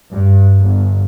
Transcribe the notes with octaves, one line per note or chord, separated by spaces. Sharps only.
G2
G1